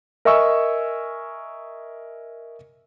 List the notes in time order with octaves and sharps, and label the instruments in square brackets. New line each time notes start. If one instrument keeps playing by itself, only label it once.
[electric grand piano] A#4 D#5 E5 G#5 C#6 E6